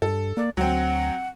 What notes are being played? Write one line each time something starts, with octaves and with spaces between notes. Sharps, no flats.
G2 A4
A#3 D5
D2 F#3 C4 F#5